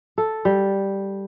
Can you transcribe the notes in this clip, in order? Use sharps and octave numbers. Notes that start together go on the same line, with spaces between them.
A4
G3